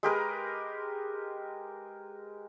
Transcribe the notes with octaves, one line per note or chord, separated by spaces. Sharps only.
G#3 G4 A#4 B4